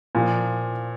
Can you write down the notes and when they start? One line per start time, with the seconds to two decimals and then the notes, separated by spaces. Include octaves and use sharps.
0.15 A#2 F3